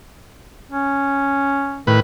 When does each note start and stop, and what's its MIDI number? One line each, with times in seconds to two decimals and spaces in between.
0.72 1.81 61
1.87 2.00 45
1.87 1.98 51
1.87 2.00 71